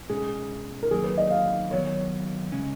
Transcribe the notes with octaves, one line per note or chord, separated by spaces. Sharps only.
B2 G#3 C#4 G#4
A#4
D#3 F#3 A#3 G#4
B4
D#5
F5
D#3 F#3 B3 C#5
C#3 G#3 C#4